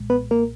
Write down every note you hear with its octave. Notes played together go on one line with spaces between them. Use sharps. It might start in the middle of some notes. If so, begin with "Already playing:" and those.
Already playing: B1 A#2 G#3
B3 B4
A#3 A#4